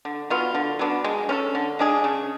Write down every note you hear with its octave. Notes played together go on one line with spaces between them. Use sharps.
D3
F#3 B3 F4
D3
F#3 B3 D4
G#3
C#4 F4 A4
D3
G#3 D4 G#4
C#3